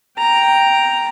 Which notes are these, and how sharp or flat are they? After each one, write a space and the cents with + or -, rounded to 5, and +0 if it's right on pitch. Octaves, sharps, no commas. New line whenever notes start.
G5 +0 A#5 +0